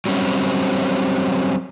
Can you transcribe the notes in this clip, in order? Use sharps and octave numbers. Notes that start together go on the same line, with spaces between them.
F#3 G3 C4 C#4